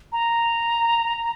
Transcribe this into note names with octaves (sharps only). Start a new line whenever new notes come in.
A#5